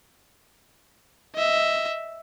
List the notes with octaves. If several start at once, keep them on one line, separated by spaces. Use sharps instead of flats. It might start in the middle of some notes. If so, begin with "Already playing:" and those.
D#5 E5